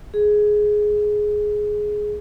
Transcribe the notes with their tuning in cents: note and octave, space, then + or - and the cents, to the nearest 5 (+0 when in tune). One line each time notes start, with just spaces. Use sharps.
G#4 +10